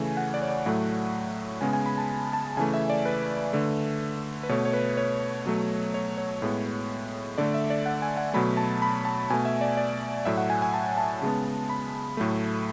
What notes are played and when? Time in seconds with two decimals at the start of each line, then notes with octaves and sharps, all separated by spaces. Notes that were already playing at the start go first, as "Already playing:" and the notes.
Already playing: C#3 E3 A3 G#5
0.17 F#5
0.34 D5
0.42 C#5
0.49 D5
0.66 A2 F#3 A3 F#5
1.61 C#3 G#3 B3 G#5
1.73 G#5
1.86 B5
1.98 A5
2.33 A5
2.57 C#3 E3 A3 G#5
2.74 E5
2.90 D5
3.05 B4
3.53 D3 A3
4.43 B4
4.49 B2 A3 C#5
4.65 C#5
4.73 B4
4.97 C#5
5.46 B2 F#3 A3
5.94 C#5
6.18 C#5
6.42 A2 G#3 B3
7.38 D3 A3 D5
7.54 E5
7.70 D5
7.86 F#5
8.02 G#5
8.17 F#5
8.34 B2 F#3 A3 B5
8.57 A5
8.82 B5
9.05 A5
9.30 B2 A3 G#5
9.45 E5
9.61 D5
9.77 D5
10.25 A2 F#3 A3 E5
10.38 F#5
10.50 G#5
10.62 G#5
10.74 A5
10.98 A5
11.22 C#3 G#3 B3
11.70 B5
12.17 A2 F#3 A3